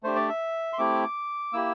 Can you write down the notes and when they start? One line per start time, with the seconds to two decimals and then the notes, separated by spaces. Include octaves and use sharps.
0.03 A3 D4 G4 C5
0.16 D5
0.29 E5
0.73 C6
0.78 A3 C4 E4 G4 D6
1.53 A#3 E4 G4 E6